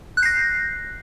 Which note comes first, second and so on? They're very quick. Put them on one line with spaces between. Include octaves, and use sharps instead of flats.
F#6 G6 C7 A#6